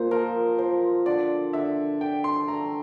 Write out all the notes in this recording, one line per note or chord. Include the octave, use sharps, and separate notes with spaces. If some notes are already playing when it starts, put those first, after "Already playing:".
Already playing: A#2 C5
F3 A#4
F3 C5
D3 D5
D3 E5
D3 G5
C6
A3 A#5